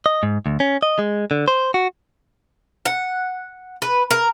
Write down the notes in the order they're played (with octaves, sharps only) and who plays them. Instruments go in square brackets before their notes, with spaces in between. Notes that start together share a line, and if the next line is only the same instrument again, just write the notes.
[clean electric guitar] D#5
G#2
D2
C#4
D#5
G#3
D3
C5
F#4
[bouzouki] F#5
B4
A#4